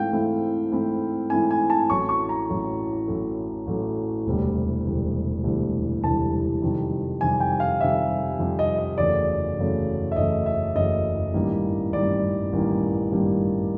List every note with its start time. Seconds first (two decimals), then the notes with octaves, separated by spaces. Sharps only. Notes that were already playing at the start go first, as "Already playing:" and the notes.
Already playing: G#2 E3 A3 C4 E4 F5 G5
0.13 G#2 E3 A3 C4 E4
0.72 G#2 E3 A3 C4 E4
1.30 G#2 E3 A3 C4 E4 G#5
1.51 G#5
1.70 A5
1.90 A1 A2 F#3 A3 C#6
2.09 C#6
2.29 A#5
2.49 A1 A2 F#3 A3
3.08 A1 A2 F#3 A3
3.67 A1 A2 F#3 A3
4.26 E1 D2 C3 E3 G3
4.84 E1 D2 C3 E3 G3
5.44 E1 D2 C3 E3 G3
6.02 E1 D2 C3 E3 G3 A5
6.62 F2 C3 D#3 G3
7.21 F2 C3 D#3 G3 G#5
7.40 G5
7.60 F5
7.80 F2 C3 D#3 G3 E5
8.39 F2 C3 D#3 G3
8.59 D#5
8.79 D#5
8.98 F#1 E2 C#3 F#3 A3 D5
9.58 F#1 E2 C#3 F#3 A3
10.12 E5
10.16 F#1 E2 C#3 F#3 A3 D#5
10.46 E5
10.75 F#1 E2 C#3 F#3 A3 D#5
11.34 A1 G2 D#3 G3 A#3
11.93 A1 G2 D#3 G3 A#3 D5
12.53 A1 G2 D#3 G3 A#3
13.11 A1 G2 D#3 G3 A#3